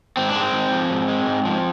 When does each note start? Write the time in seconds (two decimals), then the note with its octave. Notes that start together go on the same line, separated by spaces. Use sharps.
0.17 G#2 C4
0.29 D4
0.36 G#3 C4
0.54 G#2
0.72 F3
0.90 G#2
1.09 G#3
1.27 G#2
1.45 F3